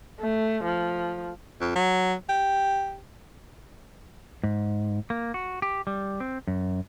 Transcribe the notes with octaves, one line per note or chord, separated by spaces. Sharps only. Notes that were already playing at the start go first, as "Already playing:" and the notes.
A3
F3
F2
F#3
G4
G#2
A#3
F#4
G4
G3
C4
F#2